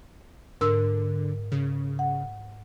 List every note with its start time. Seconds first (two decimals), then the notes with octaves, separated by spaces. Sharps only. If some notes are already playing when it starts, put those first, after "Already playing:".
0.61 G#2 D3 A#4 E6
1.52 C#3
1.99 F#5